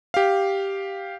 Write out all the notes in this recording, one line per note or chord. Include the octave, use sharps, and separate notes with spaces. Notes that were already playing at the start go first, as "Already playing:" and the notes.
G4 F5